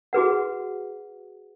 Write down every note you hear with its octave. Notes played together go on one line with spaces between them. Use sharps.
F#4 G#4 B4 F#5